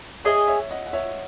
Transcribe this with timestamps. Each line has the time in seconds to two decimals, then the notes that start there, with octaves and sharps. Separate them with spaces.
0.24 G#4 C#5 D#5 E5 G#5
0.48 C#5 E5
0.71 D#5 F#5
0.86 F#5
0.93 C#5 E5